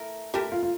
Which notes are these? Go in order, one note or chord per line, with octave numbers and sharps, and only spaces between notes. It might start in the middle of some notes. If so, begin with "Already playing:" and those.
Already playing: A3 E4 A#4
A3 E4 G4 A#4
F4
F4